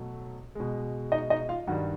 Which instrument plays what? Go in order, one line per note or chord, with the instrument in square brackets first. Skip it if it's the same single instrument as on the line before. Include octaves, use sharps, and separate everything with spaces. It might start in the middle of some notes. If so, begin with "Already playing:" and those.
Already playing: [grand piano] B2 F#3 A3
B2 G#3
D#4 D#5
D#4 D#5
F4 F5
G2 D#3 G3 F#4 F#5